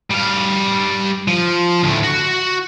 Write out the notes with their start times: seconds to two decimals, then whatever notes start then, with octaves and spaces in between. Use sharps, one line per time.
0.11 G3 F5
1.28 F3
1.83 D2 A2
2.03 F#4